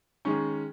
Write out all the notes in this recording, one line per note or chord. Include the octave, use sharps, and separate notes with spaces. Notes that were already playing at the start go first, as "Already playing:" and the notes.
D#3 G#3 C#4